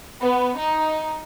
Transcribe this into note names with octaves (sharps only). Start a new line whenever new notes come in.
B3
D#4